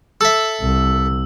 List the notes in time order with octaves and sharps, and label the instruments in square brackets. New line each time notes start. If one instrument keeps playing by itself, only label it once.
[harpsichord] A4 E5 [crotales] E6
[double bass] C2